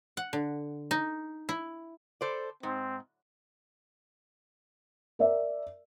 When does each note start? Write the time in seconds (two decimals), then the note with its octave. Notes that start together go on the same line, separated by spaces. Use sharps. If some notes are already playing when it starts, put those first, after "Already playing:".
0.17 F#5
0.33 D3
0.91 D#4
1.49 E4
2.21 A4 C5 D5
2.63 G#2 C4
5.19 A#4 D5 E5